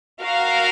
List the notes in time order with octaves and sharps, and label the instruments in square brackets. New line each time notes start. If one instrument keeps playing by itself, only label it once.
[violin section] F#4 A#4 F5